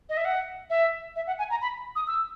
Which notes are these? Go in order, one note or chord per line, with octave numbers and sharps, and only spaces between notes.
D#5
E5
F#5
E5
E5
F#5
G#5
A#5
B5
D#6
E6